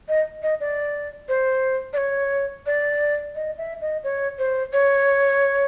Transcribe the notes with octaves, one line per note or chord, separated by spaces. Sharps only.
D#5
D#5
D5
C5
D5
C#5
D5
D#5
E5
D#5
C#5
C5
C#5